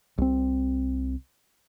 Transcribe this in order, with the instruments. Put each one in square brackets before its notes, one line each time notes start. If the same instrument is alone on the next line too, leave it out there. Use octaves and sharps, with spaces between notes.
[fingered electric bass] C2 C4